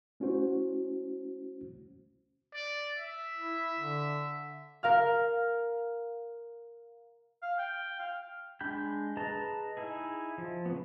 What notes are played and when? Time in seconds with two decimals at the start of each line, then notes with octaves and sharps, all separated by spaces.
0.20 A3 C#4 E4 F#4 C5
2.54 D5
2.98 E5
3.37 E4
3.79 D3
4.83 A#4 F5 F6
7.43 F5
7.59 G5
7.99 F5
8.61 G#3 D4 G5 B5 G6
9.17 G#4 B4 D#5 A5 A#5
9.77 D#4 E4 G#4
10.38 F3
10.65 C#3 B3